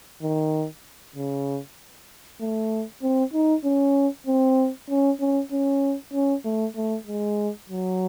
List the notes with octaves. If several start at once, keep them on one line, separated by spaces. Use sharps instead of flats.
D#3
C#3
A3
C4
D#4
C#4
C4
C#4
C#4
C#4
C#4
A3
A3
G#3
F#3